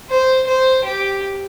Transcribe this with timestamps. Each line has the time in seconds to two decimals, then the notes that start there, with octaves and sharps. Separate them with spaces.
0.10 C5
0.47 C5
0.84 G4